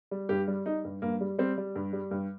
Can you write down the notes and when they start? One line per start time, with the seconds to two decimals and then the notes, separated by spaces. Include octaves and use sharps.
0.11 G3
0.29 G2 G4
0.48 G3
0.66 G3 D#4
0.85 G2
1.02 G2 A#3
1.21 G3
1.38 G3 C4
1.58 G3
1.76 G2
1.93 G3
2.11 G2